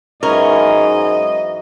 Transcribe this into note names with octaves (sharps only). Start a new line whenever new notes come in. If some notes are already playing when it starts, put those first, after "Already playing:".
G#2 E3 F#3 C#4 A#4 D#5